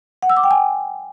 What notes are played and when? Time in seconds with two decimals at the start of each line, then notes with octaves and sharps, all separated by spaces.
0.22 F#5
0.30 E6
0.37 D6
0.44 G5
0.51 G#5